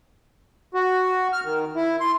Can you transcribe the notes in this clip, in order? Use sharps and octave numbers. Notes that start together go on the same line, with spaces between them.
F#4
F6
D#3
E4
C6